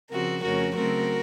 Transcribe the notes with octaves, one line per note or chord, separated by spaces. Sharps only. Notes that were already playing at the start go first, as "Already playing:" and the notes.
C#3 F3 C4 F#4 A#4
F2 C#3 A3 C#4 F#4 A#4
C#3 F#3 A3 C4 F#4 A#4